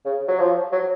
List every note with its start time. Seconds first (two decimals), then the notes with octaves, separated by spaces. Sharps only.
0.06 C#3
0.28 F#3
0.40 F3
0.72 F#3